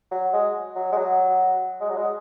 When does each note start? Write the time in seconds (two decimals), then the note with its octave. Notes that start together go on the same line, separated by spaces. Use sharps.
0.11 F#3
0.33 G#3
0.76 F#3
0.92 G#3
0.97 F#3
1.81 G#3
1.89 F#3
1.97 G#3